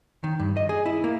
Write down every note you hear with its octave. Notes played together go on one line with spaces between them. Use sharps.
D#3
G2
D#5
G#4
E4
A#3